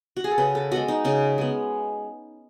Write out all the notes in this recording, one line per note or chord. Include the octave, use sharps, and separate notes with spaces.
F#4
G#4
A4
C#3 B4
A4
G#3 B3 F#4
D#4
C#3 C#4
G#3 B3